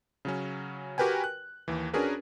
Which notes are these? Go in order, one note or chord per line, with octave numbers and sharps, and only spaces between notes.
C#3 F#3 C#4
F#4 G4 A#4 B4 G5 G#5
F#6
D#2 E3
C#4 D4 F#4 G#4 A#4 B4